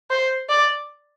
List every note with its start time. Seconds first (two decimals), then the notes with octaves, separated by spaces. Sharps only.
0.10 C5
0.49 D5